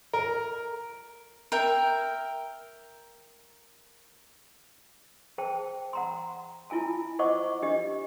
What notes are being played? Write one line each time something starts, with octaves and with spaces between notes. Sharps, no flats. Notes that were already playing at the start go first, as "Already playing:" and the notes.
A#4
A#4 E5 G5
G#4 C5 G5 A5
F#5 A#5 C6
E4 F4 G#5 A5
C5 D#5 F#5 C#6 D6
D4 G4 D#5